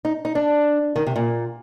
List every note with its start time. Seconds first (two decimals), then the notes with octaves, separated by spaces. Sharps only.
0.05 D#4
0.25 D#4
0.35 D4
0.96 D#3
1.07 C3
1.16 A#2